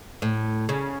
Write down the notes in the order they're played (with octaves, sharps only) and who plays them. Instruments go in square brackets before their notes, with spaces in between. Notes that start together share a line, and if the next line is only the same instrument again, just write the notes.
[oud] A2
C#3